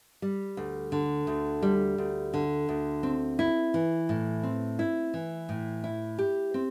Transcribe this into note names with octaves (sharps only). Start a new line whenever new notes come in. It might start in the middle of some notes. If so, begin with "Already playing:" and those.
G3
D2
D3
D2
G3
D2
D3
D2
C4
E4
E3
A2
C4
E4
E3
A2
E4
G4
C4